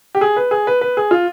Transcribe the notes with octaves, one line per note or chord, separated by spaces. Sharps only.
G4
G#4
B4
G#4
B4
B4
G#4
F4